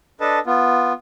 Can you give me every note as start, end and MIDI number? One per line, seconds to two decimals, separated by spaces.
0.21 0.39 62
0.21 0.39 69
0.21 0.39 71
0.21 0.39 75
0.21 0.39 81
0.47 0.93 59
0.47 0.93 65